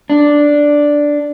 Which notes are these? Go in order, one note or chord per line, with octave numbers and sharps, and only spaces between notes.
D4